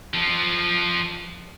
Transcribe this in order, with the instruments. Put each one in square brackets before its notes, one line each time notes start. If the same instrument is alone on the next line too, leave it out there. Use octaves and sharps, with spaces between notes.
[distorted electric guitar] F3 A4